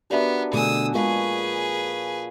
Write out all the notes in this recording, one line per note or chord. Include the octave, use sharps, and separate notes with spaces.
B3 D4 F#4 G4 A#4 D5 E5
B2 D3 A3 G#4 C5 D#6 E6
A#2 F3 G#3 G#4 B4 C#6